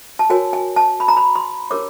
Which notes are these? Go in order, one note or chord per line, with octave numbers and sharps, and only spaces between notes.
A5
F#4 A#4 C#5 G#5
G#5
A5
B5
A#5
B5
C6
D4 G4 A#4 C#5 D6